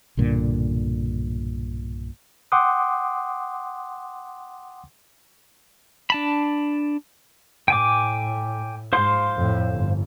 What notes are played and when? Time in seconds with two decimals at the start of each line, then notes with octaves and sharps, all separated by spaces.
0.17 B1 G2 A#2 D3
2.52 F#5 G5 C6 D6 D#6
6.10 D4 A5 B5
7.68 A2 G5 G#5 D6
8.93 G#2 C5 F5 C6
9.37 F2 A2
9.72 G1